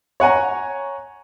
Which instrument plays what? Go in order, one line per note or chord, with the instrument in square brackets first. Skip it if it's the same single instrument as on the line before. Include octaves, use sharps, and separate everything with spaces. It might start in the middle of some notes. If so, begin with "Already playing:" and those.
[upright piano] C#5 F#5 G#5 A#5